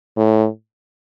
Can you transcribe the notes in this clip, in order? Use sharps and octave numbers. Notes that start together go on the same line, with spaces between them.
A2